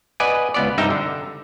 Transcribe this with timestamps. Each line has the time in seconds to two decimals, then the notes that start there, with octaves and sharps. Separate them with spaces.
0.20 B4 D5 D#5 F#5 G#5
0.54 C#2 B3 D5
0.78 C2 G2 D#4 E5 G5 A#5
0.90 D3